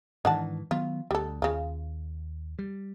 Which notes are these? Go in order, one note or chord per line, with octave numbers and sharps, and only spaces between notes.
G#2 D#3 E3 D4 F#5 A5
D#3 F#3 B3 F4
D2 G3 A4
D#2 C#3 F4
G3